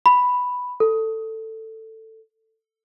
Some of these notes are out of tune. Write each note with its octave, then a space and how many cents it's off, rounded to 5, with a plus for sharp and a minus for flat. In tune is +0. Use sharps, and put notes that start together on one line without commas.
B5 +0
A4 +15